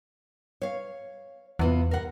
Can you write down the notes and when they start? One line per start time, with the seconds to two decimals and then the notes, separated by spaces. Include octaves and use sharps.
0.62 C#5 F5
1.59 E2 C3 B3 F4
1.91 A#4 F#5